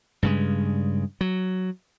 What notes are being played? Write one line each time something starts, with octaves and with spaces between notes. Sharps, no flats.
G2 C#3 G#3
F#3